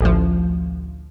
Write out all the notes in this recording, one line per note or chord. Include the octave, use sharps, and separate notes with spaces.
A1 D2 F3